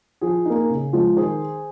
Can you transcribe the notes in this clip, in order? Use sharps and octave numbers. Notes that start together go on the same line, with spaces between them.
F3 G#4
A#3 D#4
C#3
F3 G#3
D#3 G#4 C5